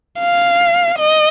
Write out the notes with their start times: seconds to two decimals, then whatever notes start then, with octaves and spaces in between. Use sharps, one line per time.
0.20 F5
0.99 D#5